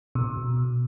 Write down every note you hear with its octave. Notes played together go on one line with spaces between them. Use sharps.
B2